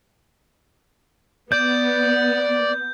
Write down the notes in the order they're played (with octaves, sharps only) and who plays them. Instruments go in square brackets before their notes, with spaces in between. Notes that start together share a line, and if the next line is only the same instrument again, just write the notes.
[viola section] B3 [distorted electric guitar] D5 [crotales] G6